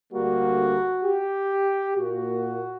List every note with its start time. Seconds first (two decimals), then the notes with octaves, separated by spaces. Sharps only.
0.12 D2 D3 G3 A#3 F#4
1.04 G4
1.97 A#2 A#3 F#4